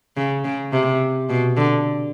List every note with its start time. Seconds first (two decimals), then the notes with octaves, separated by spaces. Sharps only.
0.17 C#3
0.44 C#3
0.73 C3
1.30 B2
1.57 D3